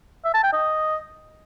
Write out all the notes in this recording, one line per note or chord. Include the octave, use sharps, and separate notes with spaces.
E5
A5
G5
D#5